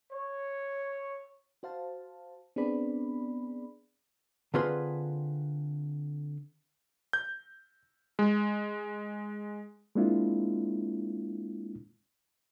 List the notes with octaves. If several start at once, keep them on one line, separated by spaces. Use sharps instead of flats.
C#5
F#4 C5 F5 A5
B3 C4 D4 G#4 D5 B5
D3 C4 F4 G#4 B4 C6
G6
G#3
G#3 A#3 C4 D4 E4 F4